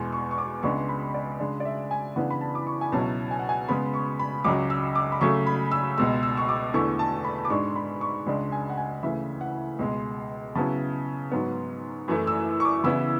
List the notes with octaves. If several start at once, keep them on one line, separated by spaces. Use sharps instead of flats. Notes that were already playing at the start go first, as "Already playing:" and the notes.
Already playing: E2 B2 G#3
C#6
C#6
D6
C#2 C#3 G#3 B3 D4 C#6
B5
D5
C#3 G#3 D4
D5
E5
G#5
C#3 E3 B3 D4 F#5
B5
A5
D6
C#6
G#5
C#2 B2 F#3 C#4 E4 A5
G#5
F#5
G#5
C#3 G#3 B3 B5
C#6
B5
C#2 C#3 F#3 D6
E6
D6
B5
C#3 F#3 A3 C#6
B5
E6
C#2 B2 G#3 E6
E6
C#6
D6
E2 D3 A3 E4 C#6
A5
B5
D6
G#2 G#3 D4 C#6
B5
C#6
C#2 C#3 G#3 D4
G#5
F#5
G#5
D2 C#3 E3 E5
F#5
C#2 B2 G#3
C#3 F#3 B3 E4 A5
G#2 F#3 B3
F#2 E3 A3 E4
E6
C#6
D6
C#3 E3 B3 E4 E6